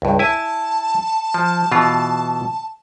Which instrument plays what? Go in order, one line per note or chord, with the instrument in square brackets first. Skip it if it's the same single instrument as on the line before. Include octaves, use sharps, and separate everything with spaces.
[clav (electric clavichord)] C#2 G2
[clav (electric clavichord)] E4 G#5 [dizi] A5
[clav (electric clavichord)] F3
B2 E3 F4